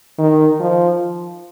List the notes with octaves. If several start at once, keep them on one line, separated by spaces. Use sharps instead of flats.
D#3
F3